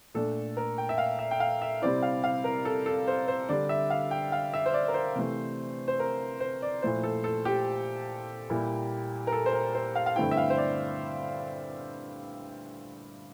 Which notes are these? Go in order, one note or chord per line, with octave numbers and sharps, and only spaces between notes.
A#2 A3 D4 A4
A#4
G5
E5
F5
E5
G5
F5
E5
C3 G3 C4 E4 D5
F5
F5
A#4
A4
A4
C5
C5
D3 G3 D4 D5
E5
F5
G5
F5
E5
C5
D5
A#4
C5
C3 E3 A3
C5
A#4
C5
D5
A#2 F3 A3 E4 C5
A4
A4
G4
A#2 G3 A#3 E4
A#4
A4
C5
A#4
C5
F5
F5
G2 D3 A3 C4 E4 G5
E5
F5
C5
D5